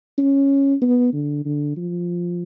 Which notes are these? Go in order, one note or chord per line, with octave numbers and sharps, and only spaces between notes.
C#4
B3
D3
D3
F3